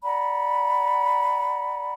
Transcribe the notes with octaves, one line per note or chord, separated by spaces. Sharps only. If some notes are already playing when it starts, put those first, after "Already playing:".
D5 F#5 A#5 B5